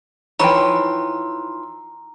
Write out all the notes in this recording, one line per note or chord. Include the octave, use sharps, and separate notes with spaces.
E3 F3 D#4 B4 C#5 G5 A#5 C6